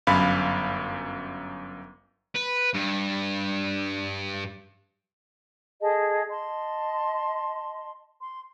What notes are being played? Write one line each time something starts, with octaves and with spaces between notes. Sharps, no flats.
G1 F#2 F5 B5
B4
G2
G#4 A4 D#5 A5
D#5 A5 C6
C6